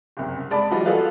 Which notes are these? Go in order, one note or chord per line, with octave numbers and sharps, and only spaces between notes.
F#1 C2
G#3 D5 A5 B5
E3 F#3 G3 F4 F#4 D#5
F4 F#4 G#4 A4 B4 F5